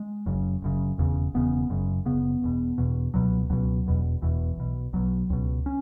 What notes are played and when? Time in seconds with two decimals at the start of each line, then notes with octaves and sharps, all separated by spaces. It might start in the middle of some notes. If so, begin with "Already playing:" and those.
Already playing: G#3
0.26 F#1 F#2 C#3
0.62 F#1 F#2 C#3
0.98 E1 E2 C#3
1.34 E1 E2 C#3 B3
1.70 F#1 F#2 C#3
2.06 F#1 F#2 C#3 B3
2.42 E1 E2 B2
2.78 E1 E2 B2
3.14 C#2 B2 F#3
3.50 C#2 B2 F#3
3.86 E1 E2 B2
4.22 E1 E2 B2 E3
4.57 B1 B2
4.93 B1 B2 F#3
5.30 C#2 B2
5.66 C#4